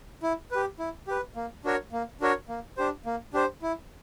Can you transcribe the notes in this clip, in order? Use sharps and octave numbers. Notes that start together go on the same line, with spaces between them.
E4
G4 B4
E4
G4 B4
A#3
D4 F#4 A#4 C#5
A#3
D4 F#4 A#4 C#5
A#3
D4 G4 C5
A#3
D4 G4 C5
E4